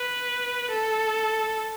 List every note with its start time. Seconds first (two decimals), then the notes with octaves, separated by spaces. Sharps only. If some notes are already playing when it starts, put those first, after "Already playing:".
Already playing: B4
0.70 A4